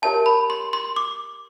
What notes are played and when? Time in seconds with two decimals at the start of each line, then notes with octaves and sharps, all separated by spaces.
0.02 G4 A#4 C#5 E5 G#5 A5
0.26 B5
0.50 C6
0.73 C6
0.96 D6